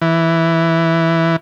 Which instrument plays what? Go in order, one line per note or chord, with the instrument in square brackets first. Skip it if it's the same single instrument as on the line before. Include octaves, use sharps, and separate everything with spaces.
[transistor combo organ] E3